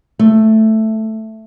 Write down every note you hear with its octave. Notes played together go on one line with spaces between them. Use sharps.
A3